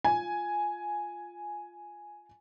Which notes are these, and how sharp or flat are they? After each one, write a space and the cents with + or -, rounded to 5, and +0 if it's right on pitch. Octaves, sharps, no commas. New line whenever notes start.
F4 +0 G#5 +5